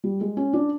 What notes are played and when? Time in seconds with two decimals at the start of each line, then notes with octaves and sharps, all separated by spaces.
0.04 G3
0.21 G#3
0.37 C#4
0.53 D4